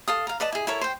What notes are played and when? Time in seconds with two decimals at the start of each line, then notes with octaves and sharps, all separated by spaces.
0.08 A4 F5 D#6
0.27 F5 A#5
0.40 B4 D5 D#5 A5
0.52 E4 G#4
0.67 E4 A4 A#4 C#5
0.81 C5 G5